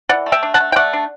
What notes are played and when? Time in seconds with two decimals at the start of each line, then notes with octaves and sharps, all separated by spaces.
0.09 E3 D5 F#5
0.26 A3
0.32 E5 G5
0.43 D4
0.54 F#5 A5
0.60 A3
0.72 G5
0.76 A3 D5 F#5
0.93 D4